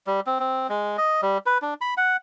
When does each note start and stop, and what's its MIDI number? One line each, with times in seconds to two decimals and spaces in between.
0.07 0.20 55
0.27 0.38 60
0.40 0.67 60
0.69 0.97 56
0.98 1.21 75
1.22 1.38 55
1.46 1.58 71
1.62 1.74 62
1.81 1.94 83
1.97 2.17 78